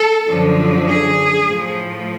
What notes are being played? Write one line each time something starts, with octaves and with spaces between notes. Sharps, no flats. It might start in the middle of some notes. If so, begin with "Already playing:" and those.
Already playing: A4
F#2 D3 F3
G#4
A2 F3